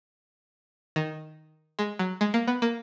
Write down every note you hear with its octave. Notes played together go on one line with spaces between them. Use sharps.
D#3
G#3
F#3
G#3
A#3
B3
A#3